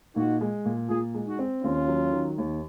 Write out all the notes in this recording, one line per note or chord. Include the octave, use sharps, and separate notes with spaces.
A#2 D#4 F#4
G#3
A#2
A#2 F4 G#4
G#3
D#4 F#4
C4
D#2 C#4 F4
F#3
D#3
D#2